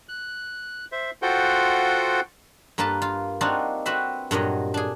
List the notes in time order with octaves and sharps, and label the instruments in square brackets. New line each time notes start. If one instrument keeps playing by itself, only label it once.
[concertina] F#6
C5 E5
F4 F#4 A4 C5 F#5 G5
[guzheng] G2 A#3 A#4 B4 A5
F4
C4 D4 D#4 F4 F#4
C4 F#4 B4 E5
G2 A#2 F#3 D#5
D4 G#4